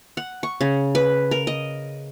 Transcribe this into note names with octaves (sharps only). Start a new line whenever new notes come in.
F#5
C#6
C#3
B4
A#4
D#5